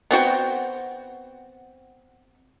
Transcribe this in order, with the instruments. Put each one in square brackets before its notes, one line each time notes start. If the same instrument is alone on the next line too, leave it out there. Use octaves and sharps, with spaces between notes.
[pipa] B3 C4 F#4 G5